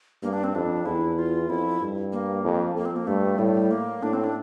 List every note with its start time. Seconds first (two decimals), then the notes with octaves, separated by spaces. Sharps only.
0.23 G2 A#3
0.33 D4
0.44 C4
0.55 F2 D4
0.86 E2 E4
1.18 F4
1.49 F2 E4
1.81 G2
2.12 A#3
2.44 F2
2.76 F2 A#3
2.85 C4
2.96 A#3
3.07 G2 A3
3.38 A2 G3
3.71 A#3
4.02 A2 D4
4.13 C4
4.24 D4